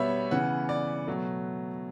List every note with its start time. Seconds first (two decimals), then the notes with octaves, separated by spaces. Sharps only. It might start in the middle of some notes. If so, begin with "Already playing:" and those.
Already playing: B2 G3 B3 C#5 E5 B5
0.31 C#3 E3 B3 F#5
0.69 D5
1.07 B2 F#3 A3